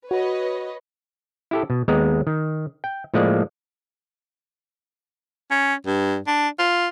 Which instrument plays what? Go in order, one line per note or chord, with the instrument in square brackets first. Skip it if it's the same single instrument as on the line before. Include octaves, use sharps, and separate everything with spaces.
[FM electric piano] F#4 [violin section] B4 C#5 D#5
[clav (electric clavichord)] E4 G4 A4
B2
D#2 G#3 B3 A#5
D#3
G5
A2 F3 G#3 A#3 D5
[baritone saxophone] C#4
G2
D4
F4